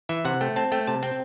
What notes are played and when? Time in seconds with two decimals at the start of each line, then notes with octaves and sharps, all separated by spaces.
0.09 E3 E5
0.25 C3 F#5
0.41 A3 G5
0.56 C4 A5
0.72 A3 G5
0.87 C3 A5
1.03 C4 G5